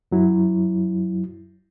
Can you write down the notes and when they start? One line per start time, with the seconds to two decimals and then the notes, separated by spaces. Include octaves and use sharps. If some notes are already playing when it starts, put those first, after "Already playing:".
0.12 F#2 F#3 E4